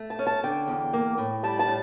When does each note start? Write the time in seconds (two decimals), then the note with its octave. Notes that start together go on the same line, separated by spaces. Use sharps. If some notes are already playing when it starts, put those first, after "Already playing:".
Already playing: A3
0.10 A5
0.19 C#4
0.27 A5
0.43 D3 G5
0.68 E2
0.93 A#3
1.18 A2
1.43 G3 A5
1.59 A5
1.67 A2